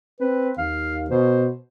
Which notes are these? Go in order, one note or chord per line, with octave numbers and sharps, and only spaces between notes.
C4 B4
D#2 F5
B2 C5